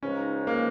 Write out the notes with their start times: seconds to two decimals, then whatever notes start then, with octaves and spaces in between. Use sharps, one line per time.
0.02 C#2 C#3 F3 G#3 C#4 D#4
0.47 A#3